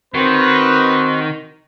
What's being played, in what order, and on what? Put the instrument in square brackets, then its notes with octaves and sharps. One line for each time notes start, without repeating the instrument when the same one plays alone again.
[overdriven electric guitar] D#3 [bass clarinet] C4 [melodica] F#4 [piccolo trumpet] B4